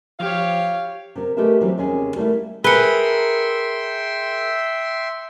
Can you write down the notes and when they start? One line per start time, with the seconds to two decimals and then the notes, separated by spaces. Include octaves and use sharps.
0.20 F3 G4 C#5 F5
1.15 C3 A#4
1.37 G#3 A3 G4 A#4 B4 E5
1.61 C3 E3 F#3 G3 C4 C#4
1.78 D#2 C3 C#4 G#4
2.16 G3 A3 A#3 E4
2.64 G#4 A#4 B4 E5 G5 C6 C#7 G7